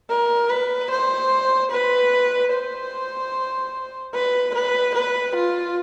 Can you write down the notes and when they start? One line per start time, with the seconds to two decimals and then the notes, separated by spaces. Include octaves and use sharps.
0.10 A#4
0.50 B4
0.91 C5
1.72 B4
2.52 C5
4.15 B4
4.55 B4
4.95 B4
5.36 F4